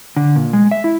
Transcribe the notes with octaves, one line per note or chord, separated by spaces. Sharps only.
D3
A#2
G#3
E5
E4